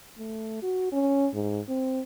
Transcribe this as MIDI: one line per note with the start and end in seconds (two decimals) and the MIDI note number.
0.18 0.60 57
0.62 0.92 66
0.92 1.28 61
1.34 1.60 44
1.68 2.01 60